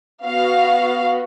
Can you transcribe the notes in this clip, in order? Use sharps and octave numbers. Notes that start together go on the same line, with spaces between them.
B3 F#4 F5